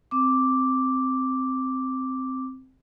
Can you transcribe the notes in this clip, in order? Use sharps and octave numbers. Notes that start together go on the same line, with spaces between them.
C4 D6